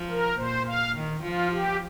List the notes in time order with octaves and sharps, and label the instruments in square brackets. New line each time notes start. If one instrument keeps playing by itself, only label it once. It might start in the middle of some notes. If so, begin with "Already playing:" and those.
Already playing: [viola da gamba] F3
[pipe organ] A#4
[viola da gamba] A#2 [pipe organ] C5
[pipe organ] F5
[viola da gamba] D#3
[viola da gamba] F3 [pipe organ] F4
[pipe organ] G4